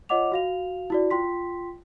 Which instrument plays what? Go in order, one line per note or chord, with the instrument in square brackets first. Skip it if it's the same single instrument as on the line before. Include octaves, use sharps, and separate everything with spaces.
[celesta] F4 C#5 D#5 F#5 D6 F7
F#4 F5 F7
E4 F#4 D5
F4 G5 C6 B6